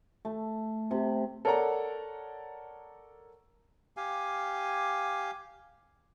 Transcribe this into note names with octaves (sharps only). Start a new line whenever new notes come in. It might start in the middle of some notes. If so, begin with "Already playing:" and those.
A3
C3
A4 A#4 C#5 D5 F#5 A#5
G4 F5 G#5